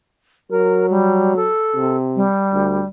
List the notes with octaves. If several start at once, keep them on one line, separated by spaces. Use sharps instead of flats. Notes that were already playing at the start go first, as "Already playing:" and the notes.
F#3 A#4
G3
A4
C3
G3
D2